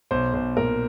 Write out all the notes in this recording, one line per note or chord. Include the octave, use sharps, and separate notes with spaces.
B1 C5
B1 C5
A#2 A#4